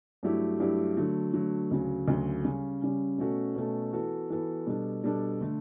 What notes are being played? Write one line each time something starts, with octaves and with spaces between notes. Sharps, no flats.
G2 F#3 A3 E4 G4
G2 F#3 A3 E4 G4
D3 F#3 A3
D3 F#3 A3
D2 C#3 F#3
D2 C#3 F#3
C#3 G3 C#4
C#3 G3 C#4
B2 A3 C#4 F#4 A4
B2 A3 C#4 F#4 A4
E3 B3 F#4 A4
E3 B3 F#4 A4
B2 G3 D4 A4
B2 G3 D4 A4
D3 A3